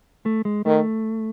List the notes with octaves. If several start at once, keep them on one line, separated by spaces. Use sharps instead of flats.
A3
G#3
D#3 A3